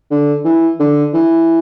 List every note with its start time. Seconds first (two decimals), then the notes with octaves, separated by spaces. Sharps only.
0.11 D3
0.45 E3
0.80 D3
1.14 E3